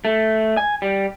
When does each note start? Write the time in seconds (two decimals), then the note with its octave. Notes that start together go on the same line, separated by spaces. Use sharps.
0.05 A3
0.57 G#5
0.82 G3